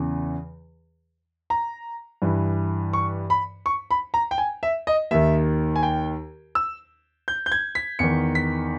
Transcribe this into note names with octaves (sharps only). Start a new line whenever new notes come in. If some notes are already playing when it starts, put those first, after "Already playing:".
Already playing: E2 C#3 E3
A#5
G2 E3
C#6
B5
C#6
B5
A#5
G5
G#5
E5
D#5
D#2 D#3 E5
G#5
G5
E6
G6
G6
G#6
B6
E2 D#3 C#7
B6